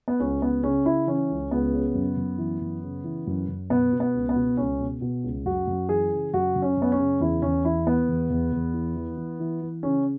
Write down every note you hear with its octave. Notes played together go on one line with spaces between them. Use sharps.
B3
C#2 C#4
C#2 B3
C#3 C#4
C#3 E4
E3 C#4
C#2
C#2 B3
C#3
F#2
F#2
E3
F#2
C#3
E3
F#2
F#2
B2 B3
B2
B3
C#2
B3
B2
C#2 C#4
B2
B2
C#2
F#2 F#4
F#2
E3 G#4
C#3
F#2 F#4
F#2
C#4
F#2 B3
C#4
C#3
E2 E4
E2 C#4
E3 E4
E3 B3
E2
E2
E2
E3
E3
E3
E3
E3
C#3 C#4